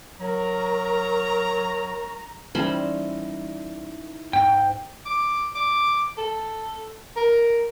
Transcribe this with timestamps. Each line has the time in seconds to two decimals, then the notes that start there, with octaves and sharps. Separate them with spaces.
0.21 F#3 A#4 A#5 C#6
2.55 E3 G3 C#4 D#4 C5 A5 B5
4.33 G#2 G5
5.06 D6
5.55 D6
6.18 A4
7.17 A#4